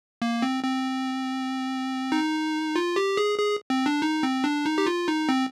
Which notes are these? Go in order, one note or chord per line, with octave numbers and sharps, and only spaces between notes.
A#3
C4
C4
D#4
F4
G4
G#4
G#4
C4
D4
D#4
C4
D4
D#4
G4
F4
D#4
C4